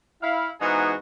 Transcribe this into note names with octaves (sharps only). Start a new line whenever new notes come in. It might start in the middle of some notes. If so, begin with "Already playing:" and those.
E4 F5
G#2 E3 B3 D#4 F#4 G#4